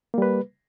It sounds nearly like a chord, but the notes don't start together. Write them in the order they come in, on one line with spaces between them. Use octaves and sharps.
A#3 G3 B4